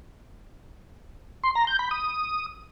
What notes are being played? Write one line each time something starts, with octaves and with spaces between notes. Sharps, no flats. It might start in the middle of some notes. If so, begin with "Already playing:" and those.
C6
A#5
G6
B5
D#6